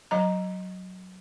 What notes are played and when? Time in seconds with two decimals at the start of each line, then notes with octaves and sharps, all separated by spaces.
0.11 F#3 D#5 A#5